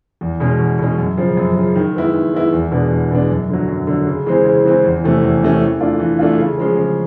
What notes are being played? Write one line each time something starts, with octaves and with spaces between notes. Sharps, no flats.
E2
B2 G#3 C#4
E2
B2 G#3 C#4
F#2
C#3 F3
F#2
C#3 F3
D#3
G#3 B3 E4
D#3
G#3 B3 E4
E2
B2 G#3 B3 D4
E2
B2 G#3 B3 D4
F#2
D3 F#3
F#2
D3 F#3
C#3
E3 G#3 C4
C#3
E3 G#3 C4
E2
C3 E3 A3 C#4
E2
C3 E3 A3 C#4
E3
A3 D4 F4
E3
A3 D4 F4
C#3
F3 G#3 C#4
C#3